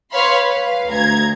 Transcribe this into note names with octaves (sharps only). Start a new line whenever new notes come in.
B4 C#5 F5 B5 C6
B4 F5
D2 A#5 G#6